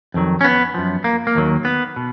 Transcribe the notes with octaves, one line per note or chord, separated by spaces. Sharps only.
F2 D#3 F#3
C#4
B3
F#2 F3
A#3
A#3
D#2 D#3 F#3
B3
B2